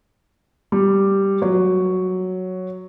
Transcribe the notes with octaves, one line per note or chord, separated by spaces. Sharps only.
G3
F#3